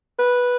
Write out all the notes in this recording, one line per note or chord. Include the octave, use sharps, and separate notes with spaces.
B4